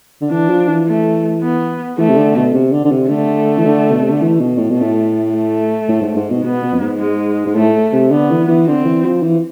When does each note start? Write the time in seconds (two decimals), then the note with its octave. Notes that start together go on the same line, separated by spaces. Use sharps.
0.21 D3
0.30 E3 D4
0.50 F3
0.69 E3
0.87 A3
1.43 B3
1.98 E3 A3
2.09 C3
2.17 D3
2.35 B2
2.54 C3
2.72 D3
2.85 D3
2.91 C3
3.09 D3 A3
3.57 E3
3.65 D3
3.91 B2
4.01 C3
4.11 D3
4.21 E3
4.40 B2
4.58 A2
4.70 B2
4.77 A3
4.82 A2
5.33 A3
5.88 A2
6.02 G#2
6.16 G#2
6.30 B2
6.44 B2 B3
6.63 B2
6.74 F2
6.81 G#2
7.00 G#3
7.47 G#2
7.55 A2 A3
7.93 C3
8.11 D3 B3
8.30 E3
8.48 E3
8.67 D3 C4
8.85 E3
9.05 F3
9.23 E3